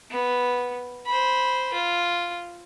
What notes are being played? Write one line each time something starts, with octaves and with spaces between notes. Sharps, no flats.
B3
C5 B5
F4